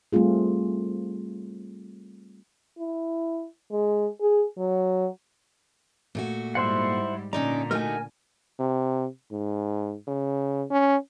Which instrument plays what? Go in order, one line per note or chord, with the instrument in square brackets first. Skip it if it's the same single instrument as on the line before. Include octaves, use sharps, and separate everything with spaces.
[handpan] G3 A3 C4 F4 G#4
[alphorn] E4
G#3
G#4
F#3
[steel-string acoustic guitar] A#2 A3 F#4
[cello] G#2 G3 [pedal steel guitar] E4 C5 F#5
[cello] A#2 D3 [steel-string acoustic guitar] C#4 D#4 D5 [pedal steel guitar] A#5
[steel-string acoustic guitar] A3 D#4 F#4 [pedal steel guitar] A#4 G#5
[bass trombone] C3
G#2
C#3
C#4